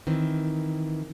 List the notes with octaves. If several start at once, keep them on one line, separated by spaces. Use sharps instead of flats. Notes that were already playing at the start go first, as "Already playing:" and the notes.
D#3 E3 C4